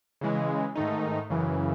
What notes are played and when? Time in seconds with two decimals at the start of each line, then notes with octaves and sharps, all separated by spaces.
0.21 C#3 E3 G#3
0.75 G#2 D#3 A3 D#4
1.30 F#2 C#3 E3